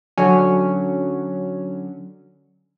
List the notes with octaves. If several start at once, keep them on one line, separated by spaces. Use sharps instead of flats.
D3 F#3 C#4